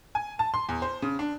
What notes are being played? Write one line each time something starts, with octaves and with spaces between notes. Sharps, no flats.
G#5
A5
C6
E2
C5
C#3
D4